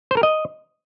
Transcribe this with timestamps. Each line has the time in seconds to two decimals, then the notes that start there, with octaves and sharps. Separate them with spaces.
0.11 C5
0.17 A#4
0.23 D#5